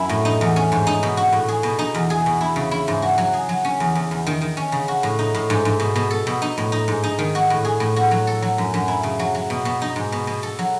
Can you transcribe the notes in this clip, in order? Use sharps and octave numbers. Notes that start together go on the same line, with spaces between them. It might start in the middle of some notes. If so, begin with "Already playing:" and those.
Already playing: F#2 E4
A2
D#4
E2
C#4
G#2
D#4
B2
F#4
A2
G#4
B2
D#4
E2
G#4
B2
E4
C#3
E4
G#2
F#4
F#3
G#4
F#3
C#4
E2
E2
E2
D#3
D#3
C#4
C#3
F#4
A2
D#4
A2
G#2
G#2
B2
B2
A4
B2
D#4
A2
D#4
G#2
D#4
D#3
F#4
A2
G#4
A2
F#4
F#3
A4
F#3
F#2
F#2
E4
C#3
F#3
F#3
B2
B2
D#4
G#2
B2
B2
A4
F#3